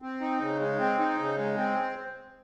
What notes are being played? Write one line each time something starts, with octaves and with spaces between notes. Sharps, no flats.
C4
D#4
C#3
G#3
C4
D#4
C#3
G#3
C4